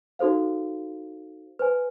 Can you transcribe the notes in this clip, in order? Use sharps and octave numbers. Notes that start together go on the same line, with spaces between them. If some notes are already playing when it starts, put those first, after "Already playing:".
D#4 F#4 A4 C5 F5
B4 C5 G#5